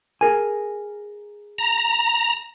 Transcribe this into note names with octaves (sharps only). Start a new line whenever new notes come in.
G#4 A#4 G#5
A#5